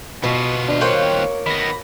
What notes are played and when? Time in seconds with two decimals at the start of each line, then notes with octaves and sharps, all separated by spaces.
0.24 B2 B3 F4
0.69 D#2 D4 F4
0.81 A#3 C5 C#5 G5 F#6
1.46 D#3 B3 B5 A#6